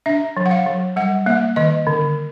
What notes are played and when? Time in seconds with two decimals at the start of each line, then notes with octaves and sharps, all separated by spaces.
0.06 D4 E5
0.37 F#3
0.46 F#5
0.51 F5
0.66 F#3
0.96 G3 F#5
1.26 A#3 E5
1.56 D#3 D#5
1.87 D3